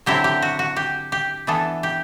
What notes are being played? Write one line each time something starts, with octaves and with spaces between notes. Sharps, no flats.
D3 F#3 C4 E4 G4
G4
F#4
F#4
G4
G4
E3 B3 D4 A4
G4